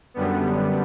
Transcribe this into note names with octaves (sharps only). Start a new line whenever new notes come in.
F#2 D3 G3 B3